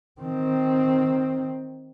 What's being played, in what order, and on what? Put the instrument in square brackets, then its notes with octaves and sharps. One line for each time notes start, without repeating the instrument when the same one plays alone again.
[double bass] D#3 C4